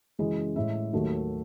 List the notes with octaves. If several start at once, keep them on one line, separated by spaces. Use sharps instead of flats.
F#2 C#3 E3 G#3 G#4
A2 G#3 E5
D#2 D#3 F#3 A3